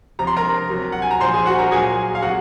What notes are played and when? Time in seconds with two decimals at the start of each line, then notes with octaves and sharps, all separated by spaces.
0.19 C3 F3 A#5
0.27 C6
0.36 A#4 A#5
0.70 C3 F#3
0.92 F#5
1.02 G#5
1.11 A#5
1.20 A#2 F3 C5 C6
1.33 G#4 G#5
1.46 F#4 F#5
1.58 A#4 A#5
1.71 A#2 F#3 G#4 G#5
2.15 F5
2.22 C3 F#3 F#4 F#5